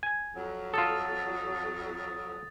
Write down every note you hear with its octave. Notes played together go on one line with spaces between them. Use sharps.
G#5
F2 F#3
F4 A4 D#6 A6